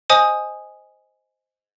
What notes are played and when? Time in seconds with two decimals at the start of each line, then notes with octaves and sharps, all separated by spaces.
0.10 C5 D#5 G#5 D#6